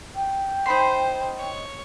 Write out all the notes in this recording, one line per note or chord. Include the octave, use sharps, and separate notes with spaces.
G5
D#4 C5 B5 C6
C#5